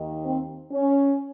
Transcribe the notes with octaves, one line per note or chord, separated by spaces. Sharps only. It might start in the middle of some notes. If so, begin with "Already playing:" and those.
Already playing: D#2 D#3
C4
C#4